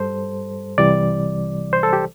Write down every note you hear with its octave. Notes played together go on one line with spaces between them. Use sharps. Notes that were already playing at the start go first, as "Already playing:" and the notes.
Already playing: G2 G3 A4 C5
C2 C3 E3 G3 D5
C5
A4
G4